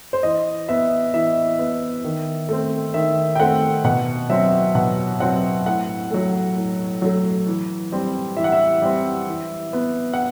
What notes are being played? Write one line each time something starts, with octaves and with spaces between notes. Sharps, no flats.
C5
E3 D#5
B3 E5
E3 E5
B3
D#3
A3 C4
D#3 E5
G5
A3 C4 F#5
B2 F#5
F#3 C4 E5
B2 F#5
F#3 C4 F#5
A2 F#5
F#3 A3
A2
F#3 A3
E3
G3 C4
E3 E5
F#5
E5
G3 C4
E3
B3
F#5